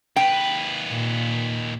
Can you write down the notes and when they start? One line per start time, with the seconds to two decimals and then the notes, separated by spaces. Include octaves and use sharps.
0.16 D#2 B4 G5
0.87 A#2